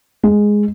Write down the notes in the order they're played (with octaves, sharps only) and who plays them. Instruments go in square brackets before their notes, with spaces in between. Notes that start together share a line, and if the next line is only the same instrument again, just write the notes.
[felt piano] G#3